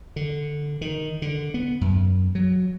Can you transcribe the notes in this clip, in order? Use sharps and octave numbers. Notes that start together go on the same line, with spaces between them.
D3
D#3
D3
B3
F#2
F#3